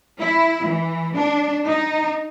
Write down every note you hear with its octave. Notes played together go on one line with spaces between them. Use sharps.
E4
E3
D4
D#4